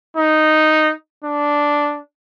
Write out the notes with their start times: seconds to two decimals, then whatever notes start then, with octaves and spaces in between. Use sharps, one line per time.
0.17 D#4
1.24 D4